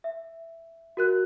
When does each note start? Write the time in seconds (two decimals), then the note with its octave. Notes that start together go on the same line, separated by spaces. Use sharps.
0.04 E5
0.97 F#4 A#4 F#6